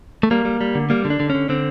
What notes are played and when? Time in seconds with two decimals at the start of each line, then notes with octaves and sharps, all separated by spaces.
0.23 A3
0.31 G3 A#3
0.45 G3
0.61 G3
0.75 D3
0.90 G3 A#3
1.05 D3
1.10 D4
1.20 D3
1.30 C#4
1.35 D3
1.49 D3 C4